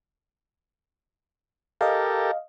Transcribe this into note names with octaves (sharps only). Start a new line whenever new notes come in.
G4 A4 A#4 D#5 F5